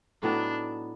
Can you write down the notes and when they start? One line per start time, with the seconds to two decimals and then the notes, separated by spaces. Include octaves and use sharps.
0.23 A2 F#3 B3 D4 D#4